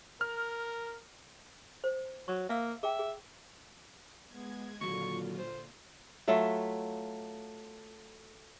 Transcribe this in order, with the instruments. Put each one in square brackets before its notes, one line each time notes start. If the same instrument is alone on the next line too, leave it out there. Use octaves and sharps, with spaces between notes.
[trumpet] A#4 [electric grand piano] F6
[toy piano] C5
[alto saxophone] F#3 [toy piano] C#6
[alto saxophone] A#3 [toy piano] E5 F5 E6
[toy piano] G#4 G5 [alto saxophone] E5
[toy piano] G#4
[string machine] G#3 G#6 [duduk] B3
[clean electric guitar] D#2 F#3 [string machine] A#2 F4 [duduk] D3 [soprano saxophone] C#6
[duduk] D3 [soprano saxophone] C5
[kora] F#3 A3 F4 E5